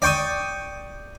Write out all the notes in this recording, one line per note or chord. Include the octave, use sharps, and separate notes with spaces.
D5 G5 C#6 D#6